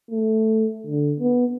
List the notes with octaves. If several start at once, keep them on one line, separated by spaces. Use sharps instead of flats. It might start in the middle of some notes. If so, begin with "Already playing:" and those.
A3
D3
B3